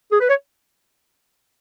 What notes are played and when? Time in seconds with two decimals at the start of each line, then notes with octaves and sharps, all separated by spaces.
0.12 G#4
0.20 B4
0.29 C#5